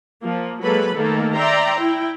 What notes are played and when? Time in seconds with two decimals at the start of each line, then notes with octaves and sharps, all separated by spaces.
0.22 F3 A#3
0.62 F#3 G#3 A#3 A4 B4 B5
0.94 D#3 A3 A#3 A4
1.34 D5 E5 G5 A#5 C6
1.77 E4 G5